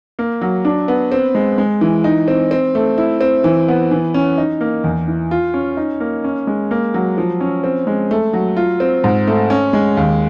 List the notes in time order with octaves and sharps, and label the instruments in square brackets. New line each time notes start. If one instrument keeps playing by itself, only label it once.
[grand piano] A#3
F#3
D4
B3
C4
G#3
G#3
E3
D#4
C4
C4
A3
E4
C4
E3
B3
E3
C#4
D#4
A#3
E2
E3
F4
C#4
D#4
A#3
C#4
G#3
A#3
F#3
F3
C#4
C4
G#3
A3
F#3
F4
C4
G#2
A3
C#4
G#3
D#2